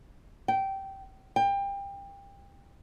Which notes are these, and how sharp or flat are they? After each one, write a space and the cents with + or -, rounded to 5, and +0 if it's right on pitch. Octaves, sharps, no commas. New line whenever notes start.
G5 -15
G5 +25